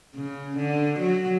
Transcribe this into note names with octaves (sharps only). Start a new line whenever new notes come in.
C#3
D3
F#3